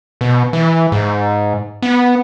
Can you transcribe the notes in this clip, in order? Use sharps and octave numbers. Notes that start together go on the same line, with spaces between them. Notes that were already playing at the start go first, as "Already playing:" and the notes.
B2
E3
G#2
B3